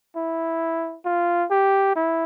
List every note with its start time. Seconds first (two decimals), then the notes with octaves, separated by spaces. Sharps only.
0.16 E4
1.05 F4
1.51 G4
1.96 E4